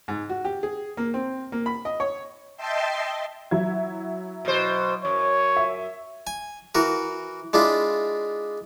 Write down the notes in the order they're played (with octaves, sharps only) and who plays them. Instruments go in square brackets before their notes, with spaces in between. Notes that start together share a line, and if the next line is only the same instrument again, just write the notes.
[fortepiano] G#2
F#4
G4
G#4
A#3
C4
A#3
B5
D#5
C#5
[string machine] D#5 E5 G5 A5 C6
[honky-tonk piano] F#3 E4 G#6
[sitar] B2 C5
[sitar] F#2 [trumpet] C#5
[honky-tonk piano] E5
[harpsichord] G#5
E3 F#4 A#4
G#3 D4 E4 F4